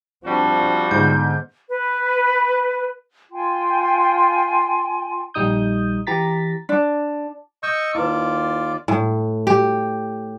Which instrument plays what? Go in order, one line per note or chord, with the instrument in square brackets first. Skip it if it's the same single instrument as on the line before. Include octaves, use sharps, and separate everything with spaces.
[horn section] F3 G3 F#4 [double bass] C4 D4
[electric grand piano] G#2 G6 [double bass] D3 B3
[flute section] B4
F4 G5 G#5 C6
[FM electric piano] A#1 G3 D#4 D#6 G6
E3 G4 A#5 A6 B6
[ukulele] D4
[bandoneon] D#5 C#6 E6 [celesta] G6
[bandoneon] D#2 F4 D5 [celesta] E4 B4
[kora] A2
G4